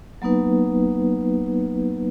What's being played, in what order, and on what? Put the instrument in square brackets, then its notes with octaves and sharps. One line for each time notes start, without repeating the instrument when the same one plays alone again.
[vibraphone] F#3 A#3 B3 D#4 B4